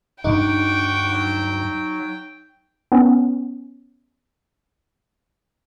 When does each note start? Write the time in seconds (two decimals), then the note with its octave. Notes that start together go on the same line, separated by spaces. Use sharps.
0.24 D2 G2 D4 D#4 F#5 G5 C#6 D6
1.13 F#3
2.92 B3 C#4